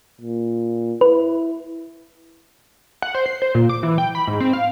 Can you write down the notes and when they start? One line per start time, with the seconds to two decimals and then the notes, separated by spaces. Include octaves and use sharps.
0.21 A#2
1.01 E4 B4
3.02 F#5
3.14 C5
3.26 C7
3.42 C5
3.55 A#2
3.69 D6
3.83 E3
3.98 G5
4.15 B5
4.27 G#2
4.40 C4
4.53 F5